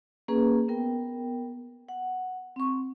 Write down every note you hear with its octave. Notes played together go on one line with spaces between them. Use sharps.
A#3 C#4 G#4 B4
B3 A#4 G5
F#5
C4 C#6